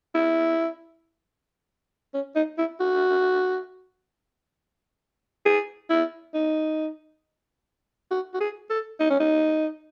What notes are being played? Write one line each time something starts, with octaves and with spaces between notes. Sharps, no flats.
E4
C#4
D#4
E4
F#4
G#4
E4
D#4
F#4
F#4
G#4
A4
D#4
C#4
D#4